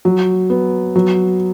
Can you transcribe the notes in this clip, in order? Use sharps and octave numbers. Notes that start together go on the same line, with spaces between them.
F#3
B3
F#3